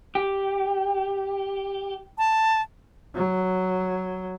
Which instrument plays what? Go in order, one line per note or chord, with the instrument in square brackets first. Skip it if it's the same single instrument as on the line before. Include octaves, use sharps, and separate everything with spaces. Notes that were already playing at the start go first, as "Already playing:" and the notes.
[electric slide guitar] G4
[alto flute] A5
[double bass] F#3